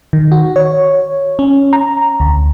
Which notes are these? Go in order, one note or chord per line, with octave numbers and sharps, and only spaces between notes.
D#3
F#4
C#5
C#4
A#5
D2